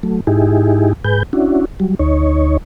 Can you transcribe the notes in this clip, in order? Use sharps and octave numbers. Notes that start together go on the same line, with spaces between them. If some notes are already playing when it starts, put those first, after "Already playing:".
F#3 A3
G#2 D#4 E4 G4 G#4
G#2 G#4 B4 G6
C#4 D4 E4 F#4
F#3 G3
D2 D#4 C#5